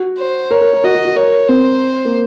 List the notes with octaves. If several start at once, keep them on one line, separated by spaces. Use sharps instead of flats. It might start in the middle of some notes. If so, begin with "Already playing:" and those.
Already playing: F#4
C5
A#4 C#5
A#4
A#4
F#4 D#5
F#4
F#4
A#4 C#5
C4 C5
A#3